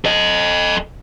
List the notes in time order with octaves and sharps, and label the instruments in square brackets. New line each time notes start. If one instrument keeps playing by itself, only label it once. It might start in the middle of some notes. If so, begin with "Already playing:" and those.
[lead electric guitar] A4 D#5